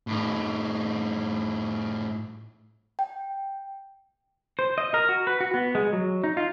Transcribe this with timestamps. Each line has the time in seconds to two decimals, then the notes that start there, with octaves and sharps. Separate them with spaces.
0.07 A2 D#4
2.99 G5
4.59 C5
4.78 D#5
4.94 A#4
5.09 F#4
5.27 B4
5.40 F#4
5.54 B3
5.75 G#3
5.93 F#3
6.24 D#4
6.37 F4